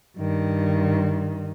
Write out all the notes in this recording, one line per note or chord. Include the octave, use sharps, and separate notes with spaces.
G2 D#3